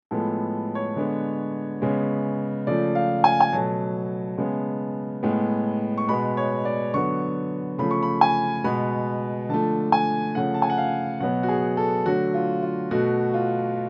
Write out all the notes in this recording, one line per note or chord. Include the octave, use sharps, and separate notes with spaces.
A2 F3 G#3 B3 A4
C#5
D3 G#3 B3
C#3 G#3 B3
C#3 F3 A3 D5
F5
G#5
G#5
B2 F#3 A3 A5
C#3 G#3 B3
A2 G#3 B3
C#6
B2 G#3 B3 B5
C#5
D5
D3 F#3 B3 C#6
C#3 F3 A3 B5
C#6
B5
G#5
B2 G#3 B3 B5
D3 F3 A3 A5
G#5
C#3 F3 A3 F#5
A5
G#5
F#5
F5
B2 F#3 B3 F#5
F#4
G#4
A4
D3 F#3 A3 F#4
F4
F4
B2 A3 F#4
F4